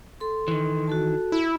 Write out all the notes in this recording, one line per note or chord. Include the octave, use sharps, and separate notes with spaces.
A4 C6
D#3 E3
F#4 A4 A5
E4